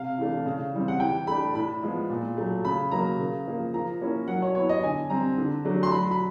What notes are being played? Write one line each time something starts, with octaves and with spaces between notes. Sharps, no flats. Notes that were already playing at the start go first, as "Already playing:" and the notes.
Already playing: C3 F5
E3 A3 D4
C#3
E3 G3 C4
F#5
E3 G5
A3 D4 B5
A2 B5
F3 G#3 B3
A#2
F#3 A3
C#3 B5
F#3 A#3 A#5
C#3
F3 A#3
F3 A#5
A#3 C#4 E4
F#3 F#5
C#5
B3 E4 C#5
D#5
D3 G#5
G3 C4 A#5
D3
F#3 A3 D4
C6
F#3 B5
B5